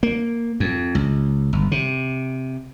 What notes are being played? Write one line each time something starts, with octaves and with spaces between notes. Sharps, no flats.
A#3
F2
C#2
G1
C3